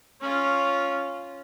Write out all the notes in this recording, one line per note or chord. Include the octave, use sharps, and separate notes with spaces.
C#4 F4